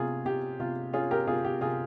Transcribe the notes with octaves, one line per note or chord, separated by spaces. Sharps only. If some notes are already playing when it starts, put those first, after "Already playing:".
Already playing: C3 C#4 F4 G#4
C3 G4
C3 F4
C#4 F4 G#4
G4 A#4
C3 F4 G#4
G4
C3 F4 G#4